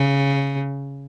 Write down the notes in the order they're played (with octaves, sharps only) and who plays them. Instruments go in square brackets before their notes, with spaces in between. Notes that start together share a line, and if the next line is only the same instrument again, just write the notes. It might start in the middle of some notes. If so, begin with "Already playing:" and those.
Already playing: [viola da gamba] C#3